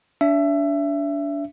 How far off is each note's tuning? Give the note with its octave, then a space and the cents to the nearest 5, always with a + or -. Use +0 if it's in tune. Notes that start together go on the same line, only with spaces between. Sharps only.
D4 -25 E5 +20